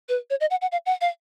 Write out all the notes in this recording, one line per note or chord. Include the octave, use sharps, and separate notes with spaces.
B4
C#5
D#5
F#5
F#5
F5
F#5
F5